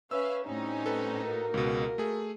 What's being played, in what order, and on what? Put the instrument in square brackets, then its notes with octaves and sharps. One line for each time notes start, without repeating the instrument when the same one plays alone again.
[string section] C#4 E5 F5 [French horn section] B4 [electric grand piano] E6
[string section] A2 D#4 [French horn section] G3 C4 C#4
[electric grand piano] A4 B4
[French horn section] A#3 F#4 A#4
[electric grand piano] C#2 B2
A3 G#4